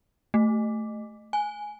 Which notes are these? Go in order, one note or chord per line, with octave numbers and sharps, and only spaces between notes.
A3
G#5